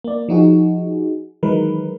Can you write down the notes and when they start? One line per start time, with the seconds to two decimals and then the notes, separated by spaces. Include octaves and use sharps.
0.04 A#3 D5
0.29 F3 D#4 F#4 G#4
1.43 D#3 E3 F#3 G#3 A#4 B4